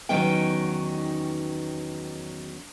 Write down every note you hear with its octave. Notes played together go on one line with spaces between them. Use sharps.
E2 D#3 F#3 C#4 D#4 G5